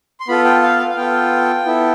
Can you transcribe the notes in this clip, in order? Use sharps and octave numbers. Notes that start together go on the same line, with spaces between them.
C6
B3 F4 A4 B5
G5
F5
F5
F5
B3 F4 A4 G5
B3 E4 A4